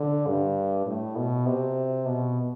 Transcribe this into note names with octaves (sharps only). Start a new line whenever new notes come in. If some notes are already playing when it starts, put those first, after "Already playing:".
Already playing: D3
G2
A2
B2
C3
B2